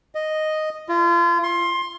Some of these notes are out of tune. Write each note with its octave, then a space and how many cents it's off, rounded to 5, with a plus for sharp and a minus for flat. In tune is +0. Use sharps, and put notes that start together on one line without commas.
D#5 -5
F4 -35
C6 +20